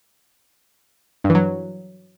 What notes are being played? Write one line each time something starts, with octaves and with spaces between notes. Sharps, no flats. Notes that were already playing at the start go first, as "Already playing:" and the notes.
G2
E3
F#3